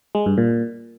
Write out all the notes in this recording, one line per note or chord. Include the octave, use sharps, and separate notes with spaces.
G#3
G2
A#2